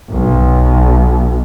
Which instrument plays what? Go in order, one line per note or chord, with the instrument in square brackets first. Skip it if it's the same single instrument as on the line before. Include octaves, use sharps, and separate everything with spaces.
[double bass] B1